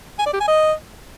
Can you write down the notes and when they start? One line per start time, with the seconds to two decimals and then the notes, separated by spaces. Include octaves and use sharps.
0.19 G#5
0.26 D5
0.33 G4
0.41 G#5
0.48 D#5